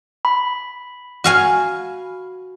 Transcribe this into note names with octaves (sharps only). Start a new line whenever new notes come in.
B5
F#4 F5 G#5